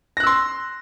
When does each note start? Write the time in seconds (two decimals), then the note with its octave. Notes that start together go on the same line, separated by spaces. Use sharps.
0.17 A#6
0.20 F#6
0.23 E6
0.27 C6